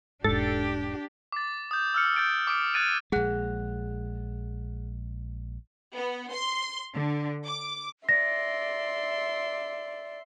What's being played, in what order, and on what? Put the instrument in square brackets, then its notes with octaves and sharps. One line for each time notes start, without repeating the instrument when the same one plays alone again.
[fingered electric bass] E1 G#2 [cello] D4 G4 [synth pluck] A4
[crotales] D6 A6
D#6 G6
E6 F6 C#7
G6 A6 D7
D6 D#6 D7
F6 F#6 G#6 A6 D7 D#7
[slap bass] A#1 G#3 [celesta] G#4 F#5 F#6
[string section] B3
C6
D3
D6
[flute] D5 [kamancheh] E5 C6 [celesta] A#6